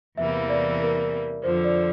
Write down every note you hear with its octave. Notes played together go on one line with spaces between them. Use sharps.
E2 C3 E3 G3 A#3 E5
D5
A#4
F2 D3 F3 C5
D5